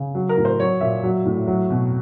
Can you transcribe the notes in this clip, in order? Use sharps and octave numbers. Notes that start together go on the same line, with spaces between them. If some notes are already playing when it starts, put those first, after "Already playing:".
Already playing: C#3
F#3
A#4
A2
C5
F#3 C#5
A#2 E5
F#3
A2
F#3
B2